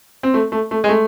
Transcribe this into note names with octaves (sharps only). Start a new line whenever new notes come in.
C4
A3
A3
A3
G#3
A3